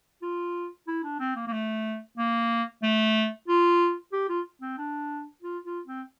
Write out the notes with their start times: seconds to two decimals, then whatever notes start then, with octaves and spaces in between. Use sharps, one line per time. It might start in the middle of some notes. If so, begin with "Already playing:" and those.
0.22 F4
0.88 E4
1.04 D4
1.20 C4
1.36 A#3
1.47 A#3
1.53 A3
2.18 A#3
2.83 A3
3.48 F4
4.13 G4
4.29 F4
4.62 C4
4.78 D4
5.43 F4
5.65 F4
5.87 C4